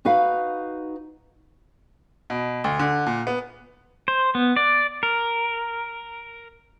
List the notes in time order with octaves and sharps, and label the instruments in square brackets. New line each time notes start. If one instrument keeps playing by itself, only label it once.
[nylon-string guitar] D#4 F#4 B4 F5
[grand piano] B2
D2
D3
A#2
B3
[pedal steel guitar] C5
B3
D5
A#4